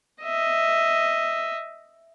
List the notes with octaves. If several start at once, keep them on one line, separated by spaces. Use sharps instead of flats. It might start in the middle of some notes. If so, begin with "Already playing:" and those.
D#5 E5